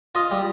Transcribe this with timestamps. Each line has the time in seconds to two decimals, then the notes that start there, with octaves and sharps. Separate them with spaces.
0.15 F4 D#5
0.31 G3